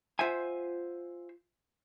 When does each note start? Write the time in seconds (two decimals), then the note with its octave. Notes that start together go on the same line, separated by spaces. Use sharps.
0.19 F4 C5 E5 F#5 G#5